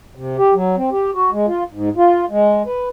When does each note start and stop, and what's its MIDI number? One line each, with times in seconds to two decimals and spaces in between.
0.15 0.37 48
0.38 0.54 67
0.54 0.76 54
0.77 0.90 60
0.92 1.10 67
1.15 1.30 66
1.32 1.46 56
1.47 1.64 65
1.73 1.89 44
1.97 2.25 65
2.30 2.62 56
2.66 2.89 71